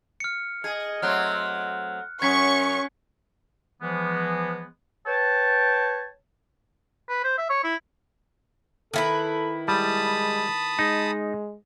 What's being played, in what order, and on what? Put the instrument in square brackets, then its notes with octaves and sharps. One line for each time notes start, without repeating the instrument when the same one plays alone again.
[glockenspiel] F6 C#7
[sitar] G#4 [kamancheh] D#5
[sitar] F#3 A3 C4 [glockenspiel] F6 F#6
[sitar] F#2 [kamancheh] C#4 [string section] C#6 [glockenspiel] G#6 B6 C#7
[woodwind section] E3 F3 G#3 B3
B4 C#5 G5 A5
[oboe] B4
C5
E5
C#5
E4
[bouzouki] D#3 E4 B4 [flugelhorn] A4
[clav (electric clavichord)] G3 [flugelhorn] G#3 [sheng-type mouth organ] A5 B5 D#6
[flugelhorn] G#3 [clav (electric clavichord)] D#4